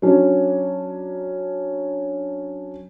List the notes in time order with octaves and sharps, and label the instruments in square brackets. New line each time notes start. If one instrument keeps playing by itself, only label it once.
[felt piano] F#3 C#4 D4